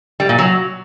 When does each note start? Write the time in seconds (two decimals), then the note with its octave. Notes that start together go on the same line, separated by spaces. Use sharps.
0.20 G3
0.29 A#2
0.38 F#3